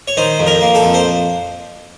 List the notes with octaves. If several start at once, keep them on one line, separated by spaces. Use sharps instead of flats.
C#5
D#3 C5
F2
A#4
A#3
A4
F2
C5